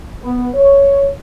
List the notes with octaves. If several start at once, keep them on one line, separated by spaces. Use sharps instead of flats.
B3
C#5